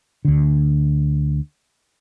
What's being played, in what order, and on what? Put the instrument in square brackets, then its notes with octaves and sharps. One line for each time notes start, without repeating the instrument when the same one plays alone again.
[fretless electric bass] D2 D3